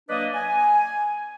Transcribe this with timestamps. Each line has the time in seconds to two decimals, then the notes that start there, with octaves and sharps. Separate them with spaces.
0.09 F#3 A#3 D4 B4 D5 D#5
0.34 G#5